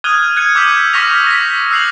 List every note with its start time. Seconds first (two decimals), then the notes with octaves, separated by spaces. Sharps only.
0.04 D#6 F6 F#6 G#6 D#7 G7
0.36 F#6 G#6 C#7 D#7
0.55 D6 E6 G6 B6
0.93 C#6 E6 F6 A#6 B6 F7
1.27 A#6 B6
1.71 E6 F#6 C7 F7 F#7